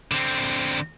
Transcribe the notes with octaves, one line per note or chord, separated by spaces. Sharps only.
D3 C4